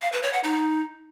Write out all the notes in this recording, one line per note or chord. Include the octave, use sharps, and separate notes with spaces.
F5
B4
C#5
F#5
D#4